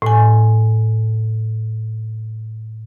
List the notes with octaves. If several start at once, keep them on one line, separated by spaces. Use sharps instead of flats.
A2 G#5